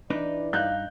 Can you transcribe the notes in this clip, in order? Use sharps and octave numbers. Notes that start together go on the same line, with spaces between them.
E3 D4 D#4 B4 D5
G2 D#4 F5 F#6 G6